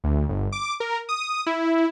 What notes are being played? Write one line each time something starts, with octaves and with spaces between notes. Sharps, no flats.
D2
G1
D6
A#4
D#6
E4